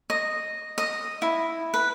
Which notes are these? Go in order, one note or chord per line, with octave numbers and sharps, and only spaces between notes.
D#5
D#5
E4
B4